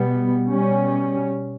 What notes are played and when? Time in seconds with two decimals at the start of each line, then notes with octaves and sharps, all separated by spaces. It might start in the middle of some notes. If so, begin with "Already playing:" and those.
Already playing: B2 G3 B3
0.50 B2 G3 C#4